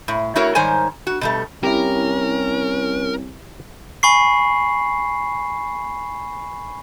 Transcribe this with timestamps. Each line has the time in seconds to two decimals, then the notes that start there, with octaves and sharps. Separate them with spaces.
0.08 A2
0.36 A3 E4 F#4 A#4 C#5
0.55 G#2 D#3 G3 C5 C#5 G#5
1.07 F#4
1.21 B2 G3 A3
1.63 C2 C#4 E4 G4 A#4
4.03 G#5 B5 C#6 C7